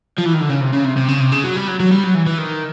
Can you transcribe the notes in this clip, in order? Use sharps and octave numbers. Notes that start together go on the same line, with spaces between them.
F3
E3
D#3
D3
C#3
C3
C#3
C3
C3
C#3
C3
C#3
F#3
G3
F#3
F#3
G3
F#3
E3
E3
D#3